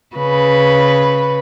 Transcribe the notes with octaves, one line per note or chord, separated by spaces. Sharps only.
C#3 B4